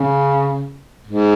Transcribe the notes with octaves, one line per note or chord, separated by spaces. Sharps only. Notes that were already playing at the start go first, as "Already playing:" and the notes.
Already playing: C#3
G#2